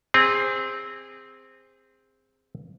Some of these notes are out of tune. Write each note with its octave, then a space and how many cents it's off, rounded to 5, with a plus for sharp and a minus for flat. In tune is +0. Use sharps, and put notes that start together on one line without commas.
C4 +0 G#4 -25